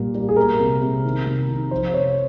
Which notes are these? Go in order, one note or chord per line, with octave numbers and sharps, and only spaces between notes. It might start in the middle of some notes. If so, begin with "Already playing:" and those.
Already playing: A#2 G3 A#3
G3
G#4
A#3 A#4
C3
C3
D#3
C3
D#3
F3 C5
C3 C#5